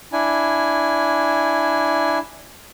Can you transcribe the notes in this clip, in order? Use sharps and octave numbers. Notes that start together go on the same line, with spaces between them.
D4 E4 G#5